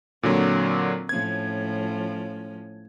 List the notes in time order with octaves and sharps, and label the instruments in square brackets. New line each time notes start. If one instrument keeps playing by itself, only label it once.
[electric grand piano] A#2 D3 F#3 [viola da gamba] C4
[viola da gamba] A2 F3 C#4 [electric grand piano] G#6